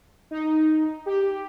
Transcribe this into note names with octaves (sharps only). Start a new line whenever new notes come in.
D#4
G4